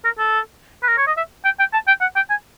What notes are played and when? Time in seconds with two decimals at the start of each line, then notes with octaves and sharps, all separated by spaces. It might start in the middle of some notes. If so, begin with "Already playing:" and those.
0.04 A#4
0.18 A4
0.83 B4
0.88 A#4
0.97 C#5
1.07 D#5
1.17 E5
1.45 G5
1.59 G5
1.73 A5
1.88 G5
2.01 F#5
2.16 G5
2.30 G#5